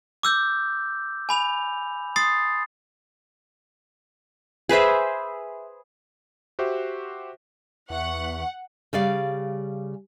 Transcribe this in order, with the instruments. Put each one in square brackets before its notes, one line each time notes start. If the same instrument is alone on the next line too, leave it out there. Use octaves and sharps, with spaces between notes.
[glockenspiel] D6 E6 G6
G#5 B5 F7
C6 D#6 A6 C7
[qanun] G#4 B4 C5 E5
[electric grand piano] F#4 G4 C5 E5
[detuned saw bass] E2 [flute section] B4 E5 C#6 [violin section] F#5
[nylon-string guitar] C#3 G3 D5 F5